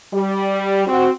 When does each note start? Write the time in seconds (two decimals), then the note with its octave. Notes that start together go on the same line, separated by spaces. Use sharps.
0.14 G3
0.87 C4 F#4